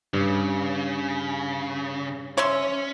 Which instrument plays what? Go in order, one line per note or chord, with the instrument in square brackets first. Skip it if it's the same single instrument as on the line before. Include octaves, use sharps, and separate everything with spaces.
[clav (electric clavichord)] G2 [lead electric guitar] C#3
[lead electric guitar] C#4 [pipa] C#5 E5 C6